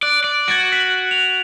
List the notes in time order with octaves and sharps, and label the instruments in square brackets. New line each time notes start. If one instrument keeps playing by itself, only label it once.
[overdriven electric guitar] D5 [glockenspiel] F#6
[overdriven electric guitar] D5
[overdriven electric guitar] F#4 [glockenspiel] G#6 A6 D7
[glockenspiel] F#6 B6 F#7
F7